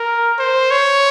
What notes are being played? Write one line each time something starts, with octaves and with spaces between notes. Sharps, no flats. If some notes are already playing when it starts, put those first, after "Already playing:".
Already playing: A#4
C5
C#5